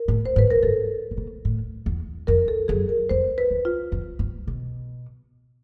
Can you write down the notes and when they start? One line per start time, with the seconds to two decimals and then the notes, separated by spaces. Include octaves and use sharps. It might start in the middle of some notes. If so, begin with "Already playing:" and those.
Already playing: A#4
0.08 A2
0.26 C5
0.36 G#2 B4
0.50 G#2 A#4
0.63 G2 A4
1.11 A2
1.17 A#2
1.45 A2
1.86 E2
2.27 F2 A#4
2.48 A4
2.68 F#2 G#4
2.89 A#4
3.09 F2 C5
3.38 B4
3.51 E2
3.65 F4
3.92 F2
4.19 G2
4.47 B2